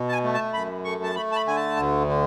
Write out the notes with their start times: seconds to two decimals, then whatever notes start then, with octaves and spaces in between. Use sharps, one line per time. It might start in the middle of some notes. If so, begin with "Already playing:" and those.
Already playing: B2
0.09 A5
0.12 G#5
0.24 A3
0.34 A5
0.54 F#2 B5
0.85 A3 C#6
1.03 A5
1.15 A3 B5
1.32 A5
1.36 B5
1.46 D3 G#5
1.56 A5
1.77 D2
2.07 D3